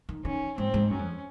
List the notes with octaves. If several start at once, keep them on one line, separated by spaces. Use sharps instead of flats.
D#3
D#3 C#4
G#2 C4
G#2
F#2 C#4
F2